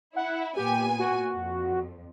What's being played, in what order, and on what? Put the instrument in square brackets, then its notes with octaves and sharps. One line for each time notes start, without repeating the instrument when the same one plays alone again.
[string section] E4 [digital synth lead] F#5
[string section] A#2 B3 G#5 [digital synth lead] G4
[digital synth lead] F#4
[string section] F2